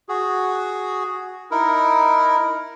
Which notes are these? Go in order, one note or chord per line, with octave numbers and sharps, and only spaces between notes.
F#4 G#4
D#4 E4 A#4